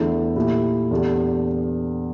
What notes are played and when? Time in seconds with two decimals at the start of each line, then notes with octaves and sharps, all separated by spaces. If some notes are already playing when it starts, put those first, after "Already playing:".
Already playing: E2 D3 A3 E4
0.36 A#2 A3 E4 G4
0.91 E2 D3 A3 D4 G4